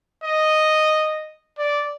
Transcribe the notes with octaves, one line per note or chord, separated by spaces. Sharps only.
D#5
D5